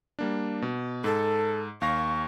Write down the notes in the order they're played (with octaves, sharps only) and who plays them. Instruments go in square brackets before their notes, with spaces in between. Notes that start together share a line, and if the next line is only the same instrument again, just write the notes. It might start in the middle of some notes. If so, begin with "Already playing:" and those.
[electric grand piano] G3 A#3 D4
B2
[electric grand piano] G#2 [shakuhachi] A4
[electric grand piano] D#2 F5 A#6 [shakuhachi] C#6